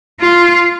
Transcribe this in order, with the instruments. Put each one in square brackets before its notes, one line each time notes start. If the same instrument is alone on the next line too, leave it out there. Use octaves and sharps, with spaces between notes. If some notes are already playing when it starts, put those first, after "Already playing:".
[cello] F4